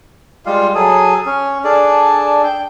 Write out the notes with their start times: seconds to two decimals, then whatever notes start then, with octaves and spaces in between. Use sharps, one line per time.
0.46 G3 G#3 F4 F5
0.75 F#3 G#4 A4 D#6
1.26 C#4
1.64 D4 G#4 A4 D5
2.44 G5